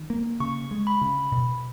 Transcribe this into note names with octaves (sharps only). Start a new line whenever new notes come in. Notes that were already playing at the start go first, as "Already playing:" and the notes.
Already playing: D#3
A#3
C#3 C#6
G#3
B5
C#3
B2